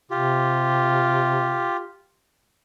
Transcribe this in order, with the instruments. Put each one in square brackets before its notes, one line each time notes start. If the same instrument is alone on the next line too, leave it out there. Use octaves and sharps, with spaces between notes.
[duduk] C3 [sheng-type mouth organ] F4 G4